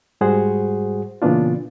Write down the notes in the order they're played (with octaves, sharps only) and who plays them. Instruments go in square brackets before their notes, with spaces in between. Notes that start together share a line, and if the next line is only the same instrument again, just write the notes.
[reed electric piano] G#2 G3 F#4 G#4 C5 F#5
A#2 C#3 E3 B3 D4 F4